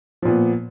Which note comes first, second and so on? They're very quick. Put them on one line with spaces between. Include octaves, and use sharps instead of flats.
F3 A#2 B3